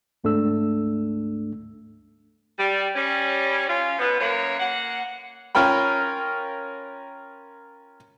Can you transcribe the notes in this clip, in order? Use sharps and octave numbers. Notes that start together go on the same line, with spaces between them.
D2 G#2 A3 D4 A4 E6
G3
G3 C#4
C#4 F4
B2 B3
F#2 A#3 C#5
A#3 F#5
C#4 F4 A#4 G5 B5